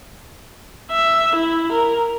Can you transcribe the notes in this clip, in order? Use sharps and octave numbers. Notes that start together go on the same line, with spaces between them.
E5
E4
A#4